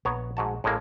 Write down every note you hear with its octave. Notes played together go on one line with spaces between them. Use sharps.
A#1 B3 C#5 A#5
G#2 F#4 A5
A1 A2 G#3 A#3